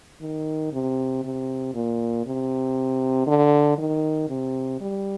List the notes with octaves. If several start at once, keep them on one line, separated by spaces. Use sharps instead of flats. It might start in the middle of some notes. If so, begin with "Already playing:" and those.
D#3
C3
C3
A#2
C3
D3
D#3
C3
G3